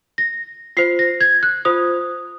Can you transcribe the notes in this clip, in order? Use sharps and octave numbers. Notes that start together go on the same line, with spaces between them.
A#6
F4 C5 C7
A#6
G#6
F#6
F4 C5 D#6